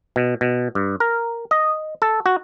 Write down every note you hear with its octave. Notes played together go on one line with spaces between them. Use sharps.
B2
B2
G2
A#4
D#5
A4
F#4